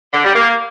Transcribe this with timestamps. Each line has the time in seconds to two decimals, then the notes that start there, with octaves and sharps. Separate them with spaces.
0.12 D3
0.24 G3
0.35 A#3